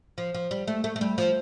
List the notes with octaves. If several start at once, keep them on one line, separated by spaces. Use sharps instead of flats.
F3
F3
G3
A3
A3
A3
G3
F3